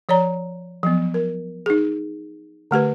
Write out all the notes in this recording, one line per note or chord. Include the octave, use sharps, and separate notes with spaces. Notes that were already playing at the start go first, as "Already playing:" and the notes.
F3 C#5 D5 A#5
F3 F#3 B3
A#4
D#4 G#4
D3 A3 G4 B4